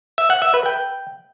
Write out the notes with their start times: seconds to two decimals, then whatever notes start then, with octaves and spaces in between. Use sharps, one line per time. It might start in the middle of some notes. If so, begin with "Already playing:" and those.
0.18 E5
0.30 F#5
0.42 E5
0.54 B4
0.66 G5